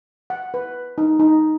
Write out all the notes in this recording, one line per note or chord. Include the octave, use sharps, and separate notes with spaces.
F#5
B4
D#4
D#4